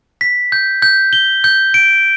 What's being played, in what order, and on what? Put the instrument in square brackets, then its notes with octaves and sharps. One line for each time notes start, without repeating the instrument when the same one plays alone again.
[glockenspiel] B6
G6
G6
G7
G6
D7